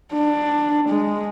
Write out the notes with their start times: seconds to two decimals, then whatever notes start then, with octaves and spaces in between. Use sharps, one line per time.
0.14 D4
0.89 G#3